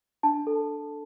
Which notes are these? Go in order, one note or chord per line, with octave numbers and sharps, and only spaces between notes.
D4 A5
A4